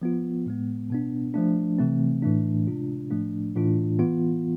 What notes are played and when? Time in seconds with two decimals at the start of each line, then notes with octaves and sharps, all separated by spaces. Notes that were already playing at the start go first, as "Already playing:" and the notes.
0.02 F3 B3 F4
0.46 A2 G#3 B3
0.90 B2 B3 D4
1.34 F3 A3 D4
1.79 C3 E3 A3 C4
2.22 A2 E3 A3 D4
2.67 C3 G#3 D4 F4
3.11 A2 F3 A3 D4
3.55 A2 E3 A3 D4 F4
3.99 E3 B3 F4